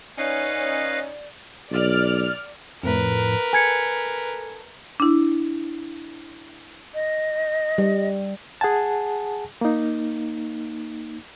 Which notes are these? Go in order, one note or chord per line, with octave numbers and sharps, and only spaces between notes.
C#4 D#4 B4 D5 F5 A#6
B1 D5 F6
F2 A2 A#4 B4
A4 G#5 G#6 C#7
D4 E4
D#5
G3
G#4 F#5 G#5 A5
A#3 D#4